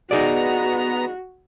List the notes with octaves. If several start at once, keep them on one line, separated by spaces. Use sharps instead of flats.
B3 D#4 F#4 G#4 D5 A#5